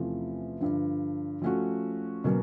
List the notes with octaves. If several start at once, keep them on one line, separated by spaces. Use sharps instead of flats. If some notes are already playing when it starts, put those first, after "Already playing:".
Already playing: E2 C3 F3 A3 C#4
G2 D3 F3
F3 A3 C#4 F#4
B2 F#3 A#3 C#4